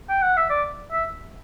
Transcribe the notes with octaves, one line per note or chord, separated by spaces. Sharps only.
G5
F#5
E5
D5
E5